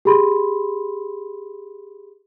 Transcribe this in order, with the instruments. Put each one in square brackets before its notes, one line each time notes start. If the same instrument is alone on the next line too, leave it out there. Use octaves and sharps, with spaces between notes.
[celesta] G4 G#4 B5 C6